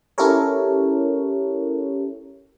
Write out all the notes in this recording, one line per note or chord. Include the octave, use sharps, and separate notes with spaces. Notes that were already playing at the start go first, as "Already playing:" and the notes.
C#4 E4 G4 A4 A#4 C#5